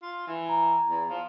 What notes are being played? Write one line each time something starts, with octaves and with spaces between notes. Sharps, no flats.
F4
E3
A#5
E2
F3